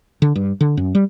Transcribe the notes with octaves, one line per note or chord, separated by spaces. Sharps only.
D3
G2
D3
F#2
G3